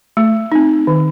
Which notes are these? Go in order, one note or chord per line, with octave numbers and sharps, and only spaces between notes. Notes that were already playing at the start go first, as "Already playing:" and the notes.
A3
C4 D#4
D#3